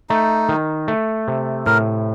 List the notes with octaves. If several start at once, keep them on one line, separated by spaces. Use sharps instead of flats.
A3 D#4
D#3
A3
C3
A2 A#4